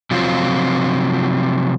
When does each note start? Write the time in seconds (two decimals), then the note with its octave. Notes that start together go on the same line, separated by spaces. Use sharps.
0.11 C3 F3 F#3 C4 F4